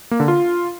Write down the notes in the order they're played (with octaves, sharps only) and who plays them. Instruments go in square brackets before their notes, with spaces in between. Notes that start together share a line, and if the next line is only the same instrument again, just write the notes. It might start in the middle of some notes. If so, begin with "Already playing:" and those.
[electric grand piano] A#3
D3
F4